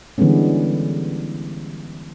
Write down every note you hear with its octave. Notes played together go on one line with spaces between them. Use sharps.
D3 E3 G3 G#3 B3 C#4